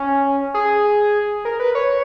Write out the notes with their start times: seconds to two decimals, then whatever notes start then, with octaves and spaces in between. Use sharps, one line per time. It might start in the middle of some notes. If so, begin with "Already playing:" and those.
Already playing: C#4
0.54 G#4
1.45 A#4
1.60 B4
1.75 C#5